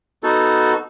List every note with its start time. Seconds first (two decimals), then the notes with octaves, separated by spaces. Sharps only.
0.23 B3 D#4 F#4 A4